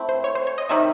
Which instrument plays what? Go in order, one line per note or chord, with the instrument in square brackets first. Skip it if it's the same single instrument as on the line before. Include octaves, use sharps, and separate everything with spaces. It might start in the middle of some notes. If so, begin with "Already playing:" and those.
Already playing: [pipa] A3 C4 E4
[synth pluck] C5
C#5
C5
C#5
D#5
[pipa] C3 D#3 G3 [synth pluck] E5